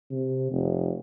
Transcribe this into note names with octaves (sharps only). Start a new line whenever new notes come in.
C3
F1